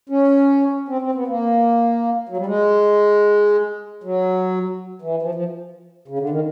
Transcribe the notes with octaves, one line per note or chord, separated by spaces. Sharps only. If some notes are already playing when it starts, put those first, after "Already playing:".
C#4
C4
C4
B3
A#3
F#3
G3
G#3
F#3
E3
F3
F3
C#3
D3
D#3